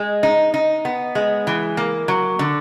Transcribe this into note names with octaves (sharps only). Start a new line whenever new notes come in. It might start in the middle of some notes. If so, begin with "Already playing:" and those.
Already playing: G#3
D#4
D#4
B3
G#3
E3
A#3
F#3
D3